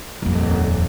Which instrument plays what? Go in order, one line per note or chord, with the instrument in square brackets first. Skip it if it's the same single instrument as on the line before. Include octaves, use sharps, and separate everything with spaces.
[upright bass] D#1 F2